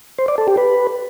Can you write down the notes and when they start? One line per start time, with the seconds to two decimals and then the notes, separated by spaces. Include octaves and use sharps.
0.19 C5
0.28 D5
0.38 A4
0.48 G4
0.57 B4